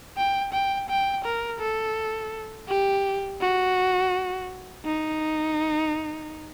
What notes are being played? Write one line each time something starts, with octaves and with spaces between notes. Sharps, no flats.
G5
G5
G5
A#4
A4
G4
F#4
D#4